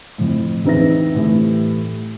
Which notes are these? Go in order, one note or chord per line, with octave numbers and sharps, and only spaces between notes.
F2 A2
E2 C4 D#4 B4 E5 A#6
A2 E3 G3 A3